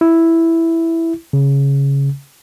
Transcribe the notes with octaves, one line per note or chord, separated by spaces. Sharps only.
E4
C#3